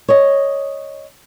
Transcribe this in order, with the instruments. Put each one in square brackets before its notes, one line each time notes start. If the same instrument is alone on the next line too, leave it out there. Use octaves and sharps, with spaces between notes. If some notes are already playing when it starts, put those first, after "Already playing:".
[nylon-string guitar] C#5 D#5